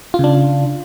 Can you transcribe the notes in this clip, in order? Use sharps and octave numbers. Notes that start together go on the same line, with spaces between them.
C#3 D4 F4